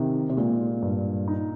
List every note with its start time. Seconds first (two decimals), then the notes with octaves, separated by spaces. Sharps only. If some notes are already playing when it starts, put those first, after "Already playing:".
Already playing: C3 D#3
0.30 C3
0.37 A#2 G#3
0.82 G2
1.28 D#4